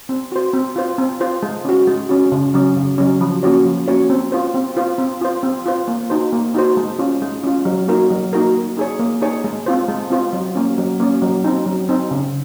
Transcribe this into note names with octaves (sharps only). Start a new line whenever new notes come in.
C4
F#4 C5
C4
F4 C5
C4
F4 C5
G#3
C#4 F#4
G#3
C#4 F#4
C#3
F#3 C#4
C#3
F#3 C#4
F3
A#3 C#4 F#4 C#5
F3
A#3 C#4 F#4 C#5
C4
F4 C5
C4
F4 C5
C4
F4 C5
C4
F4 C5
A#3
D#4 F#4 C5
A#3
D#4 F#4 C5
G#3
C#4 F4
G#3
C#4 F4
F#3
A#3 D#4 F#4 A#4
F#3
A#3 D#4 F#4 A#4
A#3
D#4 G#4 C#5
A#3
D#4 G#4 C#5
G#3
C4 F4 C5
G#3
C4 F4 C5
F#3
A#3 C#4
F#3
A#3 C#4
F#3
C4 D#4
F#3
C4 D#4
C#3